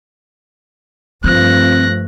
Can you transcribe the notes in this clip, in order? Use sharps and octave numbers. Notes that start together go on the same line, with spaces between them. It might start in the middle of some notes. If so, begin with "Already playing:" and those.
G2 F3 A3 C4 F#6 A#6